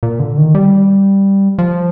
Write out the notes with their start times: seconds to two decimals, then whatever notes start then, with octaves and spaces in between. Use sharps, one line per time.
0.03 A#2
0.20 D3
0.38 D#3
0.55 G3
1.58 F3